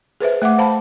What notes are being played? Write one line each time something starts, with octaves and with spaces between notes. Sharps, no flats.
G#4 B4 C5 E5
A3 E5 F#5 D6
C5 F5 A5 B5